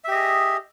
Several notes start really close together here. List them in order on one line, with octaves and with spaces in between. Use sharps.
E5 G4 D#5 G#4